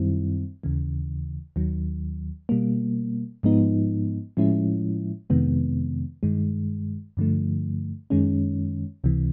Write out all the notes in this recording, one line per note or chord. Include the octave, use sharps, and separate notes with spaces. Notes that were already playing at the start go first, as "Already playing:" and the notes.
Already playing: F#2 D#3 G3 C4 E4
D#2 C#3 E3
D#2 D#3 F#3
B2 G3 A#3
G#2 F3 G#3 B3 D#4
A2 F3 G#3 C#4 E4
F2 C3 D#3 G#3 B3
G2 D#3 G#3
G2 D3 F3 A3
F#2 D#3 G#3 C#4
C#2 C3 E3